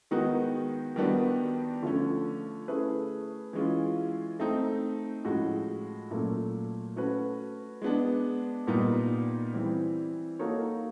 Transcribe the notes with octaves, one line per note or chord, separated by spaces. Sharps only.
D#3 G#3 B3 D#4 F#4
D#3 G3 B3 D4 F#4
D3 F3 A3 C#4
A3 C#4 E4 G#4 B4
E3 G#3 C#4 F4
A3 C4 D#4
A2 F3 G#3 C#4 F#4
A#2 F#3 A3 C#4
A3 C#4 F#4 B4
G#3 B3 D4
A#2 G3 B3 D#4
E3 G3 C4
A#3 D#4 F#4 A4 C#5